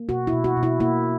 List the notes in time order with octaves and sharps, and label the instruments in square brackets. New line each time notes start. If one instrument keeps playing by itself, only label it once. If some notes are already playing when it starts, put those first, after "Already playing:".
Already playing: [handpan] A#3
B2 F#4
E4
B2
F#4
B2
E4
A#3 E4